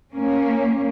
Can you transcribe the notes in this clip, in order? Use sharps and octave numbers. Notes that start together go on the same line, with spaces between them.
A#3 C#4